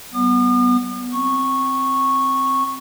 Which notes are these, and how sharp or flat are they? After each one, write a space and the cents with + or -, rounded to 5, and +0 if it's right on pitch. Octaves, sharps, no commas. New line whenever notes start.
G3 -40 B3 +0 D#6 -45
C4 +0 C#6 -10